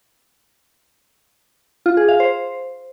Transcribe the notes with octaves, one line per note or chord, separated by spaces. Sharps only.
F4
G#4
F5
C5